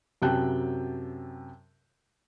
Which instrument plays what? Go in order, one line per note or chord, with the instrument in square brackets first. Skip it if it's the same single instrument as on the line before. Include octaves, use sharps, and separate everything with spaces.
[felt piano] F#2 C3 F#3 G5 A5 F#6